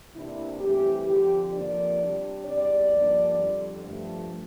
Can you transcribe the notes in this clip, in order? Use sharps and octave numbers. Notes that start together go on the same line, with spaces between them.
C3 E3 A#3 D4 E4
G2 E3 A3 C4 G4
D3 F3 C4 G4
F2 C3 F3 A#3 D4 D5
C3 G3 D4
E2 C3 G3 C4 D5
G2 F3 A#3 D4
F2 D3 G3
G2 F3 A3